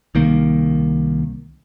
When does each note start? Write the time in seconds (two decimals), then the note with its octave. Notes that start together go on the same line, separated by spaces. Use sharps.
0.15 C2 D#3 A#3